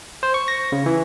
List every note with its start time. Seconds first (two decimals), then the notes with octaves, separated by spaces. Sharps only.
0.23 C5
0.34 C#6
0.48 A#6
0.72 C#3
0.86 E3